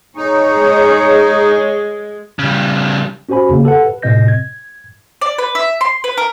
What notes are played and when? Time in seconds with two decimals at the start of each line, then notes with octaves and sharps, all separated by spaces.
0.17 D#4 G#4 C#5
0.58 G#3
2.39 C#3 G3
3.29 C#4 F#4 G4 C5 G#5 B5
3.49 E2 C#3 A#3
3.63 G4 A4 B4 F#5
3.86 B4
4.02 A2 C3 C4 D#5 G6 A#6
4.28 G#6
5.21 D5
5.38 B4
5.55 E5
5.81 C6
6.04 B4
6.17 A#4